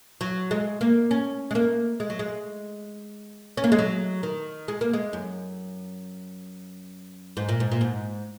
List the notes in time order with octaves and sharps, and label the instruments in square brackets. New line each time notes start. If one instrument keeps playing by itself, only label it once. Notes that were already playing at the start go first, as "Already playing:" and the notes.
[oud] F#3
G#3
A#3
C#4
G#3
A#3
G#3
F#3
G#3
C#4
A#3
G#3
F#3
D#3
G#3
A#3
G#3
F#2
G#2
A#2
G#2
A#2
G#2